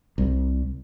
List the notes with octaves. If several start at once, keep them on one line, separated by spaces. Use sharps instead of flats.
C2